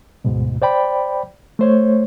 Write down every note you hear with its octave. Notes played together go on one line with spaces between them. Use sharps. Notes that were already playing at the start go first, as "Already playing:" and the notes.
D2 G#2 B2
C5 D5 G5 B5
A3 C5 C#5